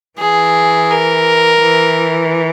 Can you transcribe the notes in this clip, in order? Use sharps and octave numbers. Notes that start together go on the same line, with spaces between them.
E3 G#4
A#4
E3